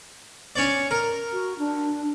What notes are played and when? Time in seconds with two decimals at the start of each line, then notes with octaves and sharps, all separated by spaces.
0.56 C#4 C#5 D5
0.91 A#4
1.33 F#4
1.58 D4